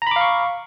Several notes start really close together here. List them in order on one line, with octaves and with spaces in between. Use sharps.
A#5 B5 D6 F5 C#6